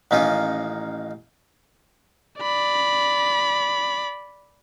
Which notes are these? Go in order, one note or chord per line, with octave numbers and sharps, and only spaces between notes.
A1 D#3 A#3 C#4 D#4 F4
D5 B5